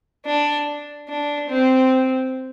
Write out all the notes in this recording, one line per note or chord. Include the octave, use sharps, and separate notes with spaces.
D4
D4
C4